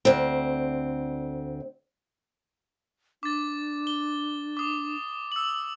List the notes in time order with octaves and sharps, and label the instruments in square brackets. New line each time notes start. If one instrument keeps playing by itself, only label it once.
[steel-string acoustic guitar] D2 C4
[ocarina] D4 [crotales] D6 A6
[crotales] G7
D6 D#6
E6 F#7